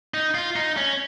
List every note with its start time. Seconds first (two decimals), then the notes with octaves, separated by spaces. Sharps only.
0.14 D#4
0.35 F4
0.56 D#4
0.77 C#4